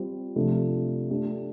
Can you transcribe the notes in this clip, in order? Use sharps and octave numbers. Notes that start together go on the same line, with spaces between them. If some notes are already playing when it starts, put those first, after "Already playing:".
Already playing: G3 C4 F4
C3 F3 A3 D4 F4
A3 D4 G4